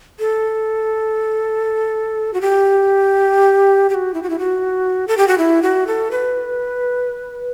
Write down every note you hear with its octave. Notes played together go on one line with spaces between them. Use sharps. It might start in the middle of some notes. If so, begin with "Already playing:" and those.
A4
F#4
G4
G4
F#4
E4
F#4
E4
F#4
A4
G4
F#4
E4
F#4
A4
B4